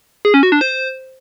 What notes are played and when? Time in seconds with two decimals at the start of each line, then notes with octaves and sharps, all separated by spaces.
0.25 G#4
0.34 C#4
0.43 F#4
0.52 D4
0.61 C5